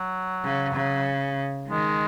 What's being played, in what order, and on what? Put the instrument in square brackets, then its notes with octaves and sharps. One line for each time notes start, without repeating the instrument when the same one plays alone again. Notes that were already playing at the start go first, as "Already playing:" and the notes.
Already playing: [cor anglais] F#3
[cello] C#3
C#3
[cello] D#3 [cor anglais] G#3